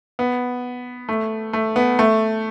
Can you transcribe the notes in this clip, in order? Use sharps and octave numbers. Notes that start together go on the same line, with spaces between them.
B3
A3
A3
B3
A3